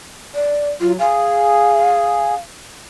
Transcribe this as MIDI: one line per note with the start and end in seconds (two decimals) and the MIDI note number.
0.35 0.70 74
0.81 0.97 54
0.81 0.92 65
0.99 2.34 68
0.99 2.36 77